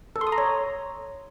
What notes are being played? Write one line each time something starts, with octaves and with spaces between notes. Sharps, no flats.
A4
C6
D#6
A#5
C#5